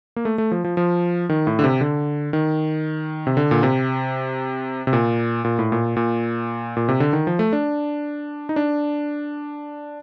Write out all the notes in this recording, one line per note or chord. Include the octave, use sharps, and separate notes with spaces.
A#3
A3
A3
F3
F3
F3
D#3
A2
D3
C3
D3
D#3
C3
D3
A#2
C3
C3
A#2
A#2
A2
A#2
A#2
A#2
C3
D3
D#3
F3
A3
D4
D#4
D4